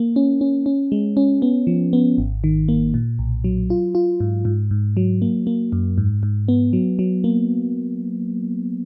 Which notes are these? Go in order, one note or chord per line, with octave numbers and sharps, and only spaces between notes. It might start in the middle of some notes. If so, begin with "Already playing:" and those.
Already playing: A#3
C#4
C#4
C#4
G#3
C#4
B3
F3
B3
G#1
D#3
A#3
A#2
B1
F#3
F4
F4
G#2
G#2
G#2
F#3
A#3
A#3
F#2
G#2
G#2
B3
F#3
F#3
A#3